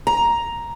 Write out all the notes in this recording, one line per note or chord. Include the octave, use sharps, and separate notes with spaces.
A#5